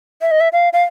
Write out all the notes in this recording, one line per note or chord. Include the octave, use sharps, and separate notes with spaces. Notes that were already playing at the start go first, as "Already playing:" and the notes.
E5
D#5
E5
F5
F5